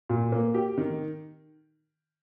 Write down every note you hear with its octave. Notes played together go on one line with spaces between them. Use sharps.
A#2
A#3
G4
D#3